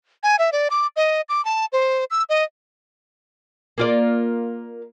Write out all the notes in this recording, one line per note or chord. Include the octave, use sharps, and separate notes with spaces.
G#5
E5
D5
D6
D#5
D6
A5
C5
E6
D#5
A#3 F4 D5